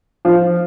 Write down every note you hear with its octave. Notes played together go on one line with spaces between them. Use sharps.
F3